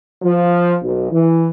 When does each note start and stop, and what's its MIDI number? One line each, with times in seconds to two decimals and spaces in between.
0.22 0.75 53
0.82 1.08 35
1.11 1.49 52